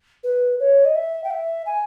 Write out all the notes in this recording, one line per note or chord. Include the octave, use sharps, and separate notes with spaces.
B4
C#5
D#5
E5
G5
E5
G#5